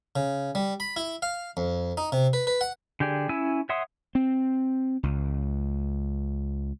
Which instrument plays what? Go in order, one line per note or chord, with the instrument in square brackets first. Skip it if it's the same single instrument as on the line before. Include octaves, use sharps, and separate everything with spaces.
[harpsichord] C#3
G3
B5
E4
F5
F2
D#4
C3
B4
B4
F#5
[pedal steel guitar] D3 G4 G#4 D5
C#4 E4 G#5 E6
C#5 E5 F#5 C6 D#6
[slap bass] C4
C#2